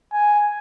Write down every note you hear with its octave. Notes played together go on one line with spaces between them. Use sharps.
G#5